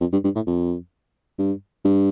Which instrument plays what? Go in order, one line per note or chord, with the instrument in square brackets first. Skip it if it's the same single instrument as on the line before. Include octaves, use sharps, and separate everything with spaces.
[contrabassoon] F2
G2
G2
A2
F2
G2
G2